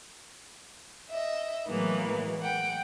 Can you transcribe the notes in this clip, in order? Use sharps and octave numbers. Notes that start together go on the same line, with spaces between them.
D#5 E5
A2 E3 F#3 G#3 A#3 B3
F#5 G5